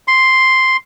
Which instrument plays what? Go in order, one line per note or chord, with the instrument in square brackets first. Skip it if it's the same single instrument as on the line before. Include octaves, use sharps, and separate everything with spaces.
[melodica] C6